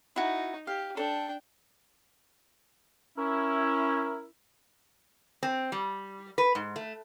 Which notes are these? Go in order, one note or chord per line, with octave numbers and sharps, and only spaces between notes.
D#4 E4 F#4
G4 F5
D4 A4 G5 A5
C#4 E4 A#4
C4
G3
B4
G#2
A3